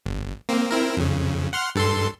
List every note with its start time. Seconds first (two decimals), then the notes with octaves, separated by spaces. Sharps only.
0.06 G1
0.49 A#3 C4
0.71 C4 E4 A#4
0.97 F2 C#3
1.53 F#5 C6 F6
1.75 G2 A4 C6